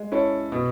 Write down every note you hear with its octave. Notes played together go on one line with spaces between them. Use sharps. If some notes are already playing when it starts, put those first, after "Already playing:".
Already playing: G#3
C#4 E4 A4 C#5
B2